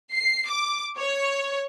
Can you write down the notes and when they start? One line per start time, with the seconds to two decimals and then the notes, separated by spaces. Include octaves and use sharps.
0.13 C7
0.49 D6
0.99 C#5